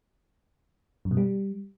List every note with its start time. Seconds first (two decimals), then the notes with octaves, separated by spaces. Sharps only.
1.05 F#2
1.11 B2
1.17 G3